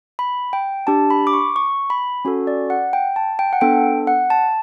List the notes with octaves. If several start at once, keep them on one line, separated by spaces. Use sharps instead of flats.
B5
G5
D4 G4 A5
B5
D6
C#6
C#6
B5
C#4 F#4 A4
D5
F#5
G5
A5
G5
F#5
B3 D4 A4 G5
F#5
A5